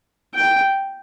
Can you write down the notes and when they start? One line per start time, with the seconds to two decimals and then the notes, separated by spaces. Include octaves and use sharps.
0.34 G5